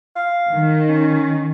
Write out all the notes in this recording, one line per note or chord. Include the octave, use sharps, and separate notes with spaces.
F5
D#3
C#4